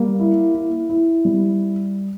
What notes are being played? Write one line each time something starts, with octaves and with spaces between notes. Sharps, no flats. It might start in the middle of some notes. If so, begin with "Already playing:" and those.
Already playing: G3 A#3
E4
E4
E4
G3